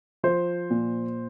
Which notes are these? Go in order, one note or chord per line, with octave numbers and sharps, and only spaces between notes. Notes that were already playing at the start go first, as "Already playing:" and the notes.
F3 C5
A#2